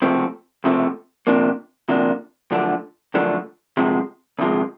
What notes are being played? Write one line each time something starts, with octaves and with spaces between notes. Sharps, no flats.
C#2 C3 F3 A3 C4
C#2 C3 F3 A3 C4
D2 C3 F3 A#3 D4
D2 C3 F3 A#3 D4
F#2 D3 F3 A3 D4
F#2 D3 F3 A3 D4
D2 C3 F3 G#3
D2 C3 F3 G#3